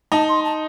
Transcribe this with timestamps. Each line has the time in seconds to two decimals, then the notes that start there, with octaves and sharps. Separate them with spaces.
0.12 D#4 A5
0.29 C6
0.44 A5